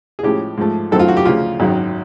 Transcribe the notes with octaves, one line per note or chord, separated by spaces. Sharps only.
G#4
A2 F3 G#3 C#4 E4 G4
G#2 F3 A3
F#2 D#3 F#3 A3 C4 A4
F4
F#4
G4
D2 C#3 F3 F4
G#1 F#2 D#3 F#3